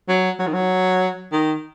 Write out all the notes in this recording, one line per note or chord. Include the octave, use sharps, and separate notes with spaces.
F#3
F#3
D#3
F#3
D#3